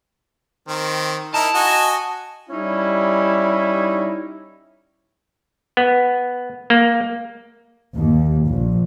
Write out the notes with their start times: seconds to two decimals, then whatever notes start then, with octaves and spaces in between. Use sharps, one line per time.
0.68 D#3 C4
1.34 D#4 E4 A#4 A5
1.54 F#4 D#5 G#5
2.50 G3 C#4 D#4 E4
5.77 B3
6.70 A#3
7.95 D#2
8.48 A#1